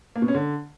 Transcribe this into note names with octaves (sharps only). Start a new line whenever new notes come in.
A#3
B2
C#4
D3